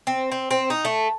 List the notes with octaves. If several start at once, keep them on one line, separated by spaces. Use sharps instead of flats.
C4
C4
C4
D#4
A3